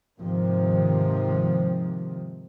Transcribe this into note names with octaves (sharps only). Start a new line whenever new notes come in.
G#2 C3 D#3 F3